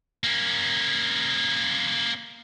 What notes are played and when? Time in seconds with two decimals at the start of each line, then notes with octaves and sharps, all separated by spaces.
0.24 A#3 C#4